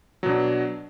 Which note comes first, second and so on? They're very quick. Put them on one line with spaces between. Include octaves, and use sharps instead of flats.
F#3 B2 D4